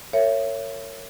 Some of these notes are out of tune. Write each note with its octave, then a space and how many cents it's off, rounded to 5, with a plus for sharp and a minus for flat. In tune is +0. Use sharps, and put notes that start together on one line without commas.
A#4 -30 C#5 +0 E5 +25